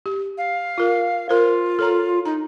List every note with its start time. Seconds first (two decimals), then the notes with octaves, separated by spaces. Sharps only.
0.06 G4
0.38 F5
0.78 F4 A#4
1.29 F4 A#4 C5
1.79 A4 C#5 A#5
2.25 D#4 A#5